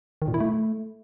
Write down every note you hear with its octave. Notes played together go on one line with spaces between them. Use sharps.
D#3
A#2
E4
A3